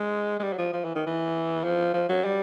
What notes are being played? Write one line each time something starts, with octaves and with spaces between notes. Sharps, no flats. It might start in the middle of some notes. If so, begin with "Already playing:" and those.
Already playing: G#3
G#3
G3
F#3
F3
F3
E3
D#3
E3
F3
F3
F#3
G3